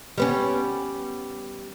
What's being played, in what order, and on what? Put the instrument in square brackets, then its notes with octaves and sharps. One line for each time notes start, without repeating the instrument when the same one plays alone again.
[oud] G3 B3 C#4